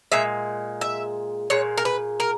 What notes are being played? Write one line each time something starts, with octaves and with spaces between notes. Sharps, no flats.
A#2 G#3 E5
E5
A#2 G#3 C#5
A#4
B4
A#4